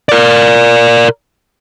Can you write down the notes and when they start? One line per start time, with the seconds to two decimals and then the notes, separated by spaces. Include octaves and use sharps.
0.09 A#4 D5